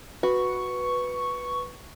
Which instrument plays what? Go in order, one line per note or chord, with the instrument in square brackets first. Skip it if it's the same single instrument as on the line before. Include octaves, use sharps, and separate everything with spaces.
[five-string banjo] F#4 [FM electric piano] B4 [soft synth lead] C#6